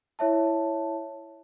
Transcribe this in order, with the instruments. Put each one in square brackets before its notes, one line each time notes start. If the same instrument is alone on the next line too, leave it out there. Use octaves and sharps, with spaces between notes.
[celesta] E4 C#5 E5 A5